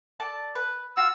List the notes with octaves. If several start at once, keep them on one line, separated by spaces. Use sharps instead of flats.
A4 D5 A5
B4
F4 F#4 E6